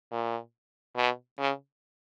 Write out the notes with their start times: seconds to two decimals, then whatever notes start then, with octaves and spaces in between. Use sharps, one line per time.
0.12 A#2
0.96 B2
1.38 C#3